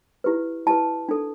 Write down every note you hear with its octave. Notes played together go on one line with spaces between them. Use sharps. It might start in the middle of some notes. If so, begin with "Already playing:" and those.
E4 G4 B4
E4 G4 B4 A5
D4 A4